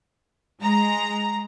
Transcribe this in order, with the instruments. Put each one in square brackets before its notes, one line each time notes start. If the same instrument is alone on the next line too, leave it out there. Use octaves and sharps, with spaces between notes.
[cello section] G#3 [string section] A#5